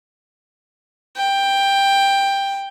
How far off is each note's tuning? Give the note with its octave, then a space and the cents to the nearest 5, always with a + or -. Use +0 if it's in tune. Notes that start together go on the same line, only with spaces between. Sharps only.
G5 +10